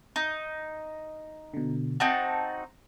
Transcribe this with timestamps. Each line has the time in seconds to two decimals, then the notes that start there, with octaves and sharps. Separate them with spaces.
0.16 D#4
1.54 B2 D3
2.00 C4 D#4 F#4 A5